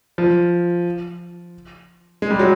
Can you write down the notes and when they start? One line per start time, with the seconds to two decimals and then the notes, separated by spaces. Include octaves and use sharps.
0.18 F3
2.22 G#3
2.31 G3
2.39 F#3